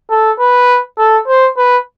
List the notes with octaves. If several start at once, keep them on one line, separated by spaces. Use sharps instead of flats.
A4
B4
A4
C5
B4